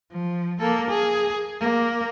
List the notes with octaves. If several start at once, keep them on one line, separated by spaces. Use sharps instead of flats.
F3
A#3 A4
G#4
A#3